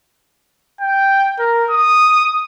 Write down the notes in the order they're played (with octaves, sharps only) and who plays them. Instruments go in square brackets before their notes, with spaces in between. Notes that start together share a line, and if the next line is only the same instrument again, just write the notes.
[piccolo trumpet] G5
A#4
D#6